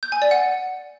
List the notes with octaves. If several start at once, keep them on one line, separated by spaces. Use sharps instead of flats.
G6
G#5
D5
F#5